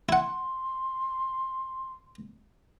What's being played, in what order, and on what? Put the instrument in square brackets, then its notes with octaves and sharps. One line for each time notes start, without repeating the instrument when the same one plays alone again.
[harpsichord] E4 F#5 [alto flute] C6